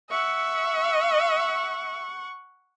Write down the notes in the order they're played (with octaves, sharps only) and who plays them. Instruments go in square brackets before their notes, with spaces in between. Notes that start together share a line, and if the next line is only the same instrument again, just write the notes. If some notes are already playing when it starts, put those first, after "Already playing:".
[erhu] E5 [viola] F#5 C#6